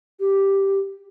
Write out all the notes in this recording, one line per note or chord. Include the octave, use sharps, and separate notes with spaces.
G4